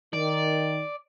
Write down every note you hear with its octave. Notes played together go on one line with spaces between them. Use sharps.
D#3 D5